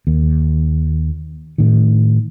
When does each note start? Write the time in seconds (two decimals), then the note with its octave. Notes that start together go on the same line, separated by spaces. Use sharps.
0.07 D#2
1.58 A2 D#3